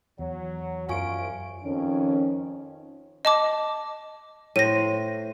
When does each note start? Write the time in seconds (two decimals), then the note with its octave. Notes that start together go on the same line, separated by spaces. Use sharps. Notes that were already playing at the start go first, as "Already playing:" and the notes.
0.19 E2 F#3
0.89 C2 F#2 F4 F5 G#5 C#6 D7
1.64 F2 D#3 C#4
3.25 D#5 A5 D6
4.56 A2 C5 A#6 D#7